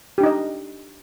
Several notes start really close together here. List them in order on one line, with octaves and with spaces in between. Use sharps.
G4 D4 D#4 D#5